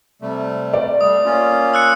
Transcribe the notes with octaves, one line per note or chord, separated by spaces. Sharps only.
C3 G3 A3
D5
G3 A3 D#6
A#3 C#4 F4
E6 F#6 C#7